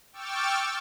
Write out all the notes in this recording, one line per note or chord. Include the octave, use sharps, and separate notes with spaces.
G5 C#6 D6 E6 F6 A6